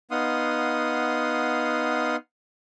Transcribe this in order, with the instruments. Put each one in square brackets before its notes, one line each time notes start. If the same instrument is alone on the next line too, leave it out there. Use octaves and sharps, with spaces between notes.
[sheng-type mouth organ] B3 D#4 F5 F#5 C6 D#6